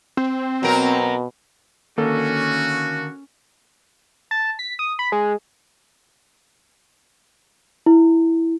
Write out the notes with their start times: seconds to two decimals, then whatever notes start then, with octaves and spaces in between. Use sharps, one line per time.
0.17 C4
0.63 B2 F#3 A#4
1.98 D3 D#3 A#3 C#4 F#4 A4
4.31 A5
4.59 B6
4.79 D#6
4.99 B5
5.12 G#3
7.86 E4